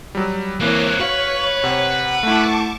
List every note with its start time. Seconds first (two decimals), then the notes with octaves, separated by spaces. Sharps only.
0.15 F#3 G3
0.60 E3 A#3 C4 A#4 C#5 F#6
0.99 F#4 B4 F5 C#6
1.64 C3 F#5
2.23 A3 E4 A5 C#6 D6